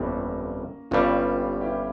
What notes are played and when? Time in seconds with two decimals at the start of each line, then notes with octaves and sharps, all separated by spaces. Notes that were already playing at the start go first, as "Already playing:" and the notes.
Already playing: G1 F2 E3 G3 A#3 C#4
0.91 G1 G2 G3 C#4 F4
1.61 E4 G4